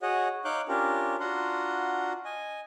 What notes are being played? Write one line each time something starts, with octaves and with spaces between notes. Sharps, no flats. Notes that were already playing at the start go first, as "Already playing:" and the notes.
F#4 G#4 C#5 D#5 F#5
D#4 C#5 F5 D6 F#6 G6
C#4 D4 F4 G4 A#4
D4 F4 F#4 F#5 A#5 C6
D#5 G#5